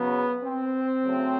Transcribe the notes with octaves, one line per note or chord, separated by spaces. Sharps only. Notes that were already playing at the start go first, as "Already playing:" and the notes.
Already playing: C#3 F#3 B3
C4
C#3 F#3 A3